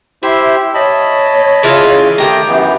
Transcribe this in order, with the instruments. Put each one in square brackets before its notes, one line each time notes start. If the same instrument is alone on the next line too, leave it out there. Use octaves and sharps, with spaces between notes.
[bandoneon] E4 G4 C5 [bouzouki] E5
[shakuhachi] C#5 [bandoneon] D#5 A5 B5
[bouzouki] C#3 E3 F4
[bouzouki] D#3 G5 A#5 [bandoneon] A3 [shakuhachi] G4
[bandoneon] F#2 E3 B3